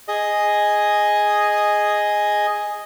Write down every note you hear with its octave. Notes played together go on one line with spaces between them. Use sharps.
G#4 D#5